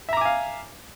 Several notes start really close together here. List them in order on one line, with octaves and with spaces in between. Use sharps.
E5 A#5 D6 G#5 F5